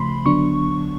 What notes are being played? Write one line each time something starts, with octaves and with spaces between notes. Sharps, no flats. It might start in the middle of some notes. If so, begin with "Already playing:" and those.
Already playing: C#3 F3 A3 B5 C6
D3 F#3 B3 D4 C#6